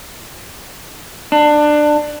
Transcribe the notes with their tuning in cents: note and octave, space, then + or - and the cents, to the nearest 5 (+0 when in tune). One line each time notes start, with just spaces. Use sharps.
D4 +20